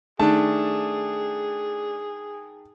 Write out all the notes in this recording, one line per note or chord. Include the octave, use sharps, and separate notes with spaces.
D#3 A3 D4 G#4 A5